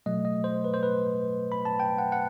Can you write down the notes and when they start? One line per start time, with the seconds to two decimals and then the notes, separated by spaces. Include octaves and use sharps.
0.06 B2 F#3 A3 D#5
0.25 D#5
0.44 C5
0.64 B4
0.74 C5
0.83 B4
1.52 B5
1.65 A5
1.80 G5
1.98 F#5
2.12 F#5